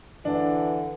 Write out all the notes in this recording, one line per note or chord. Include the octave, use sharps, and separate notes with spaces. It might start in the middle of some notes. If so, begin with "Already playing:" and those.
D3 E3 D4